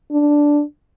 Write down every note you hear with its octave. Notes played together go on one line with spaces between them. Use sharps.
D4